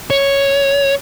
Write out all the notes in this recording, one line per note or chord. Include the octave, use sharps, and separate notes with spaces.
C#5